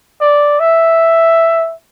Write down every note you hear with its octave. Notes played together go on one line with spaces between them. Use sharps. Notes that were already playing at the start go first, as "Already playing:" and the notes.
D5
E5